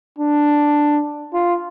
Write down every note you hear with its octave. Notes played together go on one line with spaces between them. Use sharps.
D4
F4